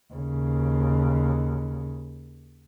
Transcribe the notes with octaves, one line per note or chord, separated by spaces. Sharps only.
D#2 C#3